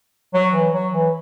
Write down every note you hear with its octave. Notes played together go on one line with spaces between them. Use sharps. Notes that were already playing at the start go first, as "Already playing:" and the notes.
F#3
E3
F#3
E3